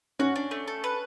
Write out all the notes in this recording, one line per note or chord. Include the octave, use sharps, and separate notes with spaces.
C#4 F#4
D4
A3
A4
B4